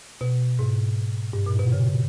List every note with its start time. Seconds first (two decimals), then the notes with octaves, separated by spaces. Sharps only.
0.21 B2
0.59 G#2
1.33 G2
1.47 A#2
1.59 B2
1.72 C#3